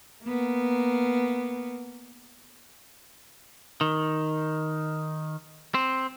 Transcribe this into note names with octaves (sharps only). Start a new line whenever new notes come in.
A#3 B3
D#3
C4